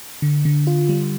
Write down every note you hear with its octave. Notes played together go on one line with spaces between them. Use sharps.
D3
D3
F4
G3